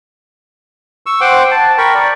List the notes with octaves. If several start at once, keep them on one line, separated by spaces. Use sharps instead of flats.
C#6 E6
C5 F#5 G5 C6 D6
A5
A#4 G5 B5 C#6
D5